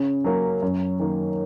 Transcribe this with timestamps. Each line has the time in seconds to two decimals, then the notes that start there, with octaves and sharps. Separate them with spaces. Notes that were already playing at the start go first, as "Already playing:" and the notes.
Already playing: C#3
0.24 F#3 A#3 C#4
0.63 F#2
1.00 D#3 A#3